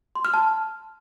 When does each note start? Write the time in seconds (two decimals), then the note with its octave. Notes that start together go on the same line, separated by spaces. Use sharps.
0.15 C6
0.25 F6
0.34 A5